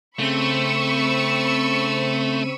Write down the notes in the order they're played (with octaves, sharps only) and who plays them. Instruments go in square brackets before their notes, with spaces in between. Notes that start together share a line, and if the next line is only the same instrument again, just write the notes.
[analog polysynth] C#3 C4 D#7 [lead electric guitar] A3 [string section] B5 C#6 E6